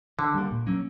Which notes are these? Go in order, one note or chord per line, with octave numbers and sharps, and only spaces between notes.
D3 D#3
G3 A#3
A#2
F#3 A#3 C#4